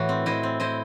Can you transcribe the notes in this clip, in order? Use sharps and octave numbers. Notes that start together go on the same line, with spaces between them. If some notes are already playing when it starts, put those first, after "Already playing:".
Already playing: A2 E3 F#4
C4
E4 C5 D#5
C4
E4 C5 D#5